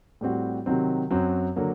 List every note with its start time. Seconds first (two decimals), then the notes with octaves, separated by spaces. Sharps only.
0.21 A2 G3 C4 F#4
0.66 C3 D#3 F#3 C4
1.11 F#2 F#3 C4
1.56 D3 F#3 A#3